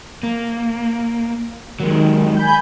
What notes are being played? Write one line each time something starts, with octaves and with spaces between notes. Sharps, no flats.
A#3
D#3 F#3 G#3
G#5 B5 G6